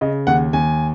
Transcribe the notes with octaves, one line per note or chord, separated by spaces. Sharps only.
C#3 D#5
D#2 F#5
D#2 G#5